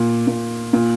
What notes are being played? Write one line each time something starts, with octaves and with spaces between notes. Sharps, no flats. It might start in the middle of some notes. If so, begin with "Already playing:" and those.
Already playing: A#2
A#2
A#2